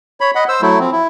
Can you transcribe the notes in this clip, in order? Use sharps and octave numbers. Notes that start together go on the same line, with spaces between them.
C#5 B5
D#5 F#5 B5
C5 E6
F#3 A3 E4
F3 C4
E4